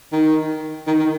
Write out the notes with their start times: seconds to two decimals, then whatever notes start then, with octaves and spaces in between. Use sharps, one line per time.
0.12 D#3
0.87 D#3
0.99 D#3